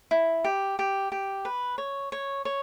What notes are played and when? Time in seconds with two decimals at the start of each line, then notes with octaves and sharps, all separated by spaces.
0.11 E4
0.44 G4
0.79 G4
1.12 G4
1.45 B4
1.78 C#5
2.12 C#5
2.45 C#5